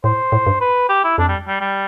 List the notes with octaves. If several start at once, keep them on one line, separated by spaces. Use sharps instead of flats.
A2 C5
A2
G2
B4
G4
E4
F2 D4
G3
G3
G3